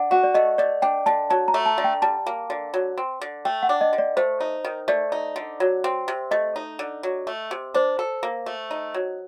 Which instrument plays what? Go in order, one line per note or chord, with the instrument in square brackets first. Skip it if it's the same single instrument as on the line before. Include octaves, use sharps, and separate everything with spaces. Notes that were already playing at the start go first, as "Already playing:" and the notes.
Already playing: [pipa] D4 [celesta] F#5
[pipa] F#4 [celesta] F#5
[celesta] D5
[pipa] A3 [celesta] D#5
[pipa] A3 [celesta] D5
[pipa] D4 [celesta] G5
[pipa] D3 [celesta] A5
[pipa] F#3 [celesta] A5
[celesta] A#5
[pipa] A3
[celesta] A5
[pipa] D3
[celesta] G5
[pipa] G3 [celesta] A5
[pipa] A#3
D3
F#3
C4
D3
[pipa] A3 [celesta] G5
[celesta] F#5
[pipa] D4
[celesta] D#5
[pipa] D3
[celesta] D5
[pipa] A3 [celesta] C5
[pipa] D#4
D#3
[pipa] A3 [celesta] D5
[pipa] D#4
D3
F#3
C4
C3
[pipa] A3 [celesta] D#5
[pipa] D#4
D3
F#3
A3
C3
[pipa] D4 [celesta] C5
[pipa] A4
A#3
A3
D#4
F#3